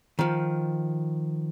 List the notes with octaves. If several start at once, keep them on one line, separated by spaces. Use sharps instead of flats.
D#3 F3